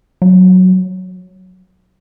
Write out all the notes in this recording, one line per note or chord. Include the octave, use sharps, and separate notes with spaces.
F#3